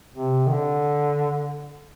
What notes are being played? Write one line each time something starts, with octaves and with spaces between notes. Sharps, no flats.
C3
D#3
D3